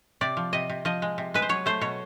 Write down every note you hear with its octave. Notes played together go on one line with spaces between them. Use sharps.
C3 D5
F3
C3 D#5
C3
F3 D#5
G#3
C3
G#3 B4
C5
F#3 C#5
A3 C5
B2 C#5